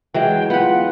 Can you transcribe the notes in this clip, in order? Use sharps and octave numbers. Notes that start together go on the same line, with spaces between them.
E3 F#3 G#3 G5
B3 F4 B4 F#5